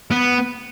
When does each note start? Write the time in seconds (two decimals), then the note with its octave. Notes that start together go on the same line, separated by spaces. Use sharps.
0.11 B3